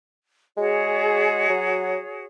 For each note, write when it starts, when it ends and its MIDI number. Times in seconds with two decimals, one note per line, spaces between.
0.57 1.45 56
0.57 2.26 66
0.57 2.26 68
0.57 2.26 73
1.50 1.98 54